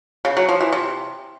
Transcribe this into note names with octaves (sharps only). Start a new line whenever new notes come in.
C#3
F#3
F3
E3
C3